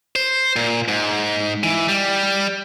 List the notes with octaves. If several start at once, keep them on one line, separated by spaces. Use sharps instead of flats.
C5
A#2
G#2
E3
G3